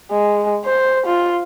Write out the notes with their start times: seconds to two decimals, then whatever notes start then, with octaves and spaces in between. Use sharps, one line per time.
0.11 G#3
0.65 C5
1.06 F4